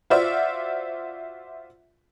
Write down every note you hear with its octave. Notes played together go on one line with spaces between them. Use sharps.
F4 F#4 C5 D5 E5